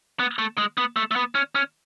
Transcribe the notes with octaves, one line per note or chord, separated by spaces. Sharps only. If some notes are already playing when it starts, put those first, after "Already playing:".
B3
A3
G#3
B3
A3
A3
B3
C#4
C#4